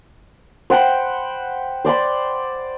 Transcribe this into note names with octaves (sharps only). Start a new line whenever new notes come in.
C5 F#5 G5 B5
C5 D5 B5 C6